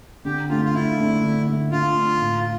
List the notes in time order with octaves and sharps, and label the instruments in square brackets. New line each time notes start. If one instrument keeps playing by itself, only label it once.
[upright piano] D3 [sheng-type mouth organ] G4
[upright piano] A3 D4 [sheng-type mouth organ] F4
[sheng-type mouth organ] F4
[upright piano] D3 [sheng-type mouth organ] E4
[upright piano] A3 D4
D3
A3 D4
[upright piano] D3 [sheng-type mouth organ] F4
[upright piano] A3 D4
A2